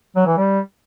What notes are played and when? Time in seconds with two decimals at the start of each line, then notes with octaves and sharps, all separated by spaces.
0.16 F#3
0.27 E3
0.37 G3